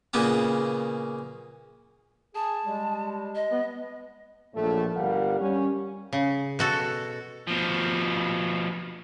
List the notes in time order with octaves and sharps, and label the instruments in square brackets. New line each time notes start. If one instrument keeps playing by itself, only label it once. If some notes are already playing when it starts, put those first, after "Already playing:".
[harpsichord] A#2 C#3 A#3 B3 C#4
[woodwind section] G#4 [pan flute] A5
[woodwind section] G3 G#3
[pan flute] D#5
[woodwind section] B3
[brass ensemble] A#1 A2 A3
G1 G3 A#4 F5 F#5
G3 C#4
[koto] C#3
B2 F#4 A4
[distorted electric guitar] B2 F3